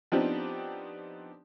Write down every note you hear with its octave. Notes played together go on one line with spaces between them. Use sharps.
F3 B3 C4 D4 D#4 G4